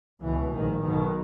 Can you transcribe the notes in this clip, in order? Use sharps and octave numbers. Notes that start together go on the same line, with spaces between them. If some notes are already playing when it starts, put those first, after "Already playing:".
C#2 B2 E3
A#1 G#2 D#3
B1 B2 D#3